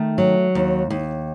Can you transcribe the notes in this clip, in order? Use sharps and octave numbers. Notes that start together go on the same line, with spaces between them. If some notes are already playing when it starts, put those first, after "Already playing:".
Already playing: D#3 A3
F#3
D#2
D#2